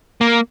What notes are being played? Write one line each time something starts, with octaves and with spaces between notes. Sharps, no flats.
A#3